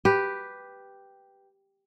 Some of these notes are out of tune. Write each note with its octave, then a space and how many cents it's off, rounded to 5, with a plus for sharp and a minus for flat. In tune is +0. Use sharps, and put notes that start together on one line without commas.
G4 +0 B4 +0